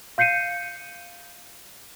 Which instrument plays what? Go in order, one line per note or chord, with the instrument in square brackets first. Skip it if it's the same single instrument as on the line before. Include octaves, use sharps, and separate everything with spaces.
[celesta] F5 G6 C7 C#7 D#7